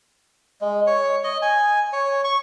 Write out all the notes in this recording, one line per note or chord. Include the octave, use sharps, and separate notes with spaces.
G#3
C#5
D#5
G#5
C#5
C#6